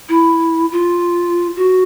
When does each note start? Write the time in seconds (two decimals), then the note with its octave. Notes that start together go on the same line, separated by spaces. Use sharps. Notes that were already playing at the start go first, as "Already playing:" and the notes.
0.09 E4
0.72 F4
1.56 F#4